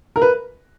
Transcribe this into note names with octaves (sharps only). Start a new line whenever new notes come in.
A#4
B4